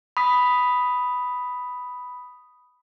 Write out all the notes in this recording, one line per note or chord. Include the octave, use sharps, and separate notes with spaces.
B5 D#6 B6